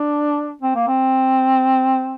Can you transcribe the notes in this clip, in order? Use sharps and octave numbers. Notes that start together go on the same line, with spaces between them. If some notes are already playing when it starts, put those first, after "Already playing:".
Already playing: D4
C4
A#3
C4